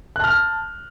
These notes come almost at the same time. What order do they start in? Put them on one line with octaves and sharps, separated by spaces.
F#6 A5 F6